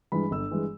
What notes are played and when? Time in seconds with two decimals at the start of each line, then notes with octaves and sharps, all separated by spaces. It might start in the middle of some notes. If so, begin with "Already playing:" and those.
0.12 G2 E3 G#3 B5
0.31 G1 E6
0.51 G2 E3 G#3